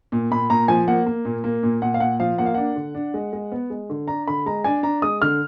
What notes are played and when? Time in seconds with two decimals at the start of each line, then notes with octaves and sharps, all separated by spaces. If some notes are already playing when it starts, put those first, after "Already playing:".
0.12 A#2
0.31 A#2 B5
0.50 A#2 A#5
0.68 F3 G#5
0.88 A#3 F#5
1.06 A#3
1.25 A#2
1.44 A#3
1.63 A#2
1.82 A#2 F#5
1.94 F5
2.00 A#2 F#5
2.20 F3 F5
2.38 A#3 F#5
2.46 F5
2.54 D4 F#5
2.76 D3
2.95 D4
3.14 G#3
3.33 G#3
3.52 B3
3.70 G#3
3.90 D3
4.08 D4 A#5
4.27 D3 B5
4.46 G#3 A#5
4.64 D4 G#5
4.83 D4 A#5
5.02 G#3 D#6
5.21 D3 F6